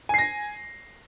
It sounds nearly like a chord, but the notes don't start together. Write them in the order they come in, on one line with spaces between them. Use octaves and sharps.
G#5 C7 A#6